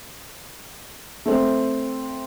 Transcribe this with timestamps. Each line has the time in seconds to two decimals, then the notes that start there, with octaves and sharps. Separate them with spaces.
1.26 A3 C4